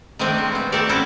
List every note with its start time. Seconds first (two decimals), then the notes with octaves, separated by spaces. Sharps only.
0.19 D#3 F3 A3 A#3 C4 D4
0.38 G#3
0.52 B3 C4
0.72 A3 C4 G4 A4 A#4 D5
0.89 F3 F#3 A3 C#4 E4 F#4